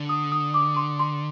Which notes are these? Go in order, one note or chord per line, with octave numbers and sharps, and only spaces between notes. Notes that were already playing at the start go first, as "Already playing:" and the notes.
Already playing: D3
D#6
D#6
D6
C6
C6